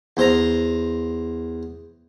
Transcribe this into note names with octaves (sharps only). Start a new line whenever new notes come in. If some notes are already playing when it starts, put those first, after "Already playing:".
E2 C5 A#5